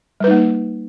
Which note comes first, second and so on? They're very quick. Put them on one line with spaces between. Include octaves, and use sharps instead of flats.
G3 B4 D#4 A#3